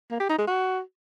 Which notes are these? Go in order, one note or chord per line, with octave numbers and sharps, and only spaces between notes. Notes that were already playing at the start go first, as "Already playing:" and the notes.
A#3
G4
D#4
G#3
F#4